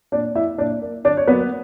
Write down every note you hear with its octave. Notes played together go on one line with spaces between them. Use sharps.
A#2 D4 D5
A#3 E4 E5
A#2 D4 D5
A#3
D3 D4 D5
C#5
F#3 A#3 B3 B4